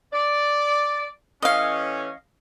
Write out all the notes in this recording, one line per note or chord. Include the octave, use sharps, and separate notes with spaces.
D5
E3 A3 C#4 D#5 F5